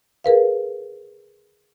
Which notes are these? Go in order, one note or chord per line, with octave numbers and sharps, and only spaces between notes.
G#4 A#4 B4 F5